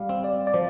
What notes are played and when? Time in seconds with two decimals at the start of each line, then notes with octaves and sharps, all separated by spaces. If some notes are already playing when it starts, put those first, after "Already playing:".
Already playing: G3 F5
0.09 C4
0.24 D5
0.47 D5
0.54 F3 C5